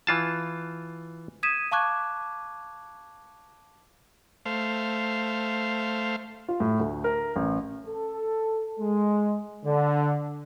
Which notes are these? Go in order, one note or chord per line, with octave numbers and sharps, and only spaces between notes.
E3 F4 A5
D#6 G#6 B6 D#7 E7
F5 A5 C#6 D6 F#6 G#6
A3 C5 F5
F4
A2
D2
A#4
A1
A4
G#3
D3